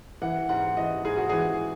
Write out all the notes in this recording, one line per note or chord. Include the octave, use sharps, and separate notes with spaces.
E3 F#5
G#2 F#5
E3 D#5
G#2 G#4
F#4
E3 G#4